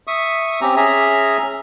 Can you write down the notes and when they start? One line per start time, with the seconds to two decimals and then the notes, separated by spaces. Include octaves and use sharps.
0.07 E5 C#6 D#6
0.61 C4 C#4 G4 A#5
0.76 C#4 G#4 E5 A#5